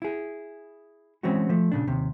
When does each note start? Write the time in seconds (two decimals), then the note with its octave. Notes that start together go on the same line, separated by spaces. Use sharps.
0.02 E4 G#4
1.23 E3 G#3 C4 C#4 F#4
1.49 F3 A3
1.72 A#2 C#3 D4
1.87 D#2 C3